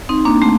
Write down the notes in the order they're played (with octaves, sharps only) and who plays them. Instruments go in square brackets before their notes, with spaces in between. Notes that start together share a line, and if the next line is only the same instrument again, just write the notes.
[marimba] C4 D#4
A#3 D4
A3 C4